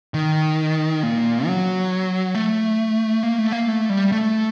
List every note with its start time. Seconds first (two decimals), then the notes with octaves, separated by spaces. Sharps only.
0.14 D#3
1.03 A#2
1.47 F#3
2.35 A3
3.23 A#3
3.39 A3
3.52 A#3
3.68 A3
3.90 G3
4.12 A3